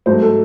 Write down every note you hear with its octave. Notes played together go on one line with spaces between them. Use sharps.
G#2 F#3 A3 C5
A4